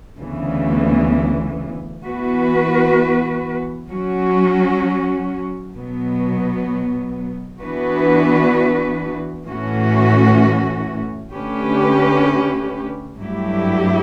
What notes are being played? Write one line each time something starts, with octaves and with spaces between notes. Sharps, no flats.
D2 C#3 E3 B3
E3 B3 F#4 B4
F#3 C#4 F#4
B2 F#3 B3
E3 B3 D4 F#4 B4
A2 E3 A3 C#4 F#4
D3 A3 C#4 G4 B4
G2 F#3 A3 E4 G4